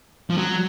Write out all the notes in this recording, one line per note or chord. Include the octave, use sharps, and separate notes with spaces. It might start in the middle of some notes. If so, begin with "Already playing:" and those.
F3
F#3